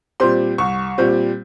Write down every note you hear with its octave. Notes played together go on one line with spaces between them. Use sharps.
A#2 G3 C4 C6
C2 C#6
A#2 G3 C4